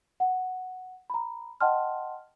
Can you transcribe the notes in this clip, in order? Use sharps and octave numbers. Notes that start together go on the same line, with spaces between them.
F#5
A#5 B5
D#5 F#5 G5 A5 C6 F6